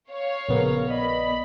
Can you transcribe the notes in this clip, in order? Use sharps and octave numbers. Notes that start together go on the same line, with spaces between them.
C#5 F5
A#1 C#3 B3 A#4
D5 D#5 B5